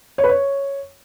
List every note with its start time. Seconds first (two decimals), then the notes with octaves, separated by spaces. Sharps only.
0.18 C#5
0.24 B4
0.29 C#5